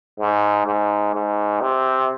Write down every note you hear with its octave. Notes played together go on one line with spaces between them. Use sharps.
G#2
G#2
G#2
C3